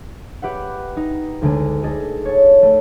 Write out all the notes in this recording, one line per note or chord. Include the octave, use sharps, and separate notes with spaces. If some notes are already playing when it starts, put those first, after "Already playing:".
G4 B4 E5 F#5
D#4
D2 D3 G#3 D#7
G#4 A4 D#5
C#5 A5
A3